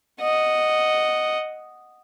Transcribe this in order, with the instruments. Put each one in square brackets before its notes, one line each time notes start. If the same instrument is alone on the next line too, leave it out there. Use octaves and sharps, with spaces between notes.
[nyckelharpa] D#5 F#5